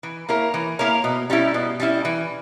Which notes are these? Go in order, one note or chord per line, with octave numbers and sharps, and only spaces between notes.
E3
A#3 E4 A#4 C#5
E3
A#3 E4 A#4 C#5
B2
G3 C#4 E4
B2
G3 C#4 E4
E3